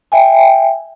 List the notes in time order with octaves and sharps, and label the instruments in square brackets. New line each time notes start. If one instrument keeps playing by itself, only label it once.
[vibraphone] E5 G5 G#5